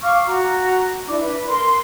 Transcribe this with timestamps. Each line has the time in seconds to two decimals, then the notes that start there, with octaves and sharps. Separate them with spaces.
0.02 F5 C#6 D6 F6
0.26 F#4 A#5
1.08 D4 E4 D5 D6
1.20 B4
1.47 A#4 C6